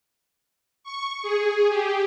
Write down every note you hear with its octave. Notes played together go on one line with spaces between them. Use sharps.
C#6
G#4
G4